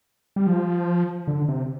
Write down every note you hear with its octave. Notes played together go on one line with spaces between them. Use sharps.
G3
F3
D3
C3